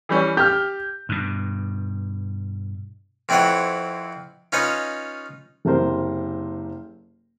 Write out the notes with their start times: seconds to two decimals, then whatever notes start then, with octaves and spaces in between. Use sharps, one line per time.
0.09 E3 G3 C#4
0.37 G4 F6 G6
1.09 G2 B2
3.29 F2 C4 E4 B4 C#5 F#5
4.52 C#4 D#4 F4 B4 C#5 D#5
5.65 F#1 C3 A#4 C5